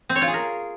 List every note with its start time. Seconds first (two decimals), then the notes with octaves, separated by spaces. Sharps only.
0.09 C4
0.15 C#5
0.22 F4
0.28 G#4
0.34 A#4